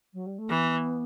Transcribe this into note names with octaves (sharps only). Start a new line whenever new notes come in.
F#3
G3
A3
E3 B3